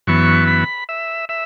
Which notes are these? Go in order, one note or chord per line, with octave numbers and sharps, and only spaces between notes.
F#2 E3 B3 C#6
B5
E5
E5